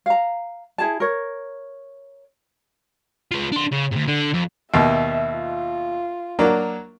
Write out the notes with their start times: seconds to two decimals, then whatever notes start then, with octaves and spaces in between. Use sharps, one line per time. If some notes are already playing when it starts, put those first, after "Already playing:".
0.06 F5 A#5
0.78 E4 G#4 A5
1.00 A#4 C#5
3.31 G#3 F4
3.52 D4 C6
3.72 C#3
3.91 D2 G#2
4.08 D3
4.34 F2
4.74 D#2 B2 E5
5.34 F4
6.39 F#3 A#3 D4